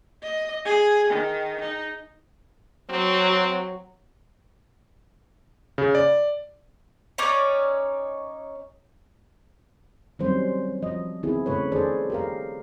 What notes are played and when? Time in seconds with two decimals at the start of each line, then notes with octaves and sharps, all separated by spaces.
0.22 D#5
0.65 G#4
1.10 D#3
1.61 D#4
2.90 F#3 C4
5.78 C#3
5.95 D5
7.18 C#4 D#4 C#5 D5
10.19 D#3 F#3 G3 C4 C#4 C5
10.82 F3 D#5
11.23 D#3 B3 C4 E4 G#4
11.46 C#3 A3 B4 C#5
11.72 D#3 G#4 A4 C5 D5
12.10 G4 A#4 F5